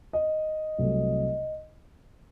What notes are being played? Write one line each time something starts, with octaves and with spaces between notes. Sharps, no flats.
D#5
C2 C3 F#3 A3